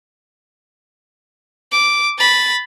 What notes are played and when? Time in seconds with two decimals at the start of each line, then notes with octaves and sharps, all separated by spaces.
1.72 D6
2.18 B5 A6